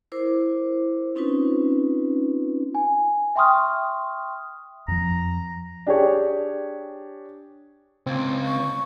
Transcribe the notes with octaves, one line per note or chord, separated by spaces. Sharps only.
E4 A#4 C5 D6
C4 C#4 D#4 F4 B4
G#5
E5 G5 C6 C#6 D#6 F6
F2 F3 A#5
D4 G4 G#4 C#5
C#2 C4
C#6